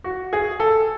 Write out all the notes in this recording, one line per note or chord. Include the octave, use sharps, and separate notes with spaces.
F#4
G#4
A4